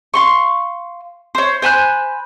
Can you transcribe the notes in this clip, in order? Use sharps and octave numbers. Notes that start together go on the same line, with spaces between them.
F5 C6 C#6
C5 C#5
C5 G#5 B5 F#6